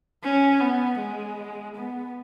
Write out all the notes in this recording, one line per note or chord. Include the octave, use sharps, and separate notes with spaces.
C#4
B3
G#3
B3